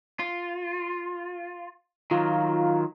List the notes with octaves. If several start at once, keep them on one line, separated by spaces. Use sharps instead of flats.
F4
D#3 F#3 F4